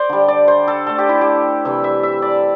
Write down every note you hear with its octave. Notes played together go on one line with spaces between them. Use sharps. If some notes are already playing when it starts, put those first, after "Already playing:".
Already playing: C5 D5
D3 G3
D5
C5
A4
D3 A3 A4
G4
E4
G4
C3 E3 G3 E5
E5
E5
D5